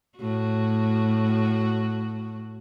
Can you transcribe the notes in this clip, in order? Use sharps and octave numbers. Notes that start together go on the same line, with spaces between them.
A2 F#4